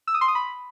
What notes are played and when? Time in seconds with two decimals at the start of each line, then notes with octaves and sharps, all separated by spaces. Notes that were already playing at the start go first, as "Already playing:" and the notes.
0.07 E6
0.14 D#6
0.21 C6
0.28 D#6
0.35 B5